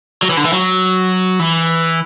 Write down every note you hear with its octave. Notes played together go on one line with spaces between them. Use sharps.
F#3
E3
D3
E3
F#3
E3